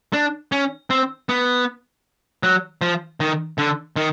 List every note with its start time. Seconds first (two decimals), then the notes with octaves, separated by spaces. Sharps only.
0.13 D4
0.52 C#4
0.90 C4
1.29 B3
2.43 F#3
2.82 F3
3.20 D#3
3.58 D3
3.96 D#3